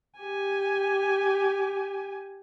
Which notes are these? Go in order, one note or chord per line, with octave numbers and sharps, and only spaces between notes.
G4 G#5